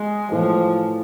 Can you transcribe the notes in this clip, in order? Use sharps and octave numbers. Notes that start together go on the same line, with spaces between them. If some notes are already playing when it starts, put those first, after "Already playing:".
Already playing: G#3
A2 E3 F3 A3